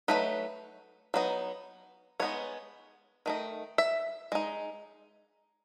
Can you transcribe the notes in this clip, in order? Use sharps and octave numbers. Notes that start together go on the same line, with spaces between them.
F#3 A3 D#4 B4
F#3 B3 D#4
G#3 B3 D#4 C#5
D#3 A3 D#4
E5
G#3 D#4